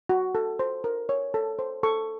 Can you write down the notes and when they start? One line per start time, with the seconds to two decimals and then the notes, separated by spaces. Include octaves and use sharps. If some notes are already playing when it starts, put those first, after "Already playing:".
0.09 F#4
0.35 A4
0.59 C5
0.84 A#4
1.09 C#5
1.34 A4
1.59 C5
1.83 A4 C#6